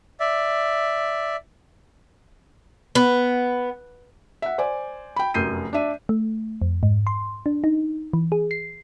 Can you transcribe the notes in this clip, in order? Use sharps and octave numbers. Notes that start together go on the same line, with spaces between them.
D5 E5
B3
E5 F#5
C5 D5 G#5
G5 B5
F1 F#2 G6 C7 D#7
D4 D5 E5 D#7
A3
F2
G#2
C6
D4
D#4
E3
G#4
C7